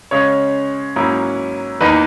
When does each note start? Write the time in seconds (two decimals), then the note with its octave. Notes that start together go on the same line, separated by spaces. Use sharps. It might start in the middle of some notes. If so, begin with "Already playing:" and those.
0.11 C#3 G#3 C#4 C#5
0.96 G#2 F#3 A#3 C#4 E4
1.81 E2 D#3 A#3 D#4 B4